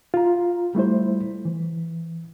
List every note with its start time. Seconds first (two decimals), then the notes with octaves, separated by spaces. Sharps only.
0.14 F4 A#5
0.75 G3 A3 E4 C5
1.45 E3